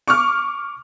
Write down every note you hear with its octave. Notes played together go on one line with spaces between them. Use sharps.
C#6 D6 F6